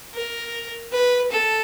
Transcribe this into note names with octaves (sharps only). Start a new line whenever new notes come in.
A#4
B4
A4